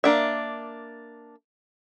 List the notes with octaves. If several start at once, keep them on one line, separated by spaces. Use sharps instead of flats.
A#3 D4 E5